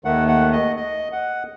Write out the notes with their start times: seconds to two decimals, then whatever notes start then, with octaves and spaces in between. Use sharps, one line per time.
0.04 D#2 D#3 A3 F#5
0.28 F#5
0.52 D#5
0.76 D#5
1.12 F#5